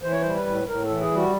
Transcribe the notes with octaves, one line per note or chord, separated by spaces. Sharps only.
E3 C5
C#5
G3 C5
B4
A2
A2 A#4
A4
E3
G#4
G3
F#4